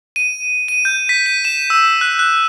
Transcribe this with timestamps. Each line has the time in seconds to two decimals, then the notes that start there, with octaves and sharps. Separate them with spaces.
0.16 D#7
0.68 D#7
0.85 G6
1.09 B6
1.26 D#7
1.45 E7
1.70 E6
2.01 F#6
2.19 F#6